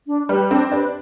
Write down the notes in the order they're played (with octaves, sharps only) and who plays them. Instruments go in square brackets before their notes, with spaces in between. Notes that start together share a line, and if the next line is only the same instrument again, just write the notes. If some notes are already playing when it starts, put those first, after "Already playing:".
[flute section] D4
[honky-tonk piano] G3 [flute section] G4 B4
[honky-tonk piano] C4 [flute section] D4
[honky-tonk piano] D4 [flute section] G4 B4